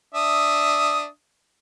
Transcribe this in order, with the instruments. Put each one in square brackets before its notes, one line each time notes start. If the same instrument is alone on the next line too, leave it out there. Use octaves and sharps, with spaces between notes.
[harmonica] D4 E5 D#6